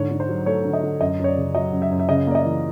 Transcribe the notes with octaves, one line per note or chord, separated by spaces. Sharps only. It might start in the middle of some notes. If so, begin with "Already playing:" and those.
Already playing: G#2 D3 C#5
D3
C5
F#3
A3 C#5
D3
D#5
D3
F#2 D#5
F#2 C#5
D5
C#3
F#3 D#5
F#2
E5
F#2
E5
C#3 D#5
A#3 D5
D#5
E3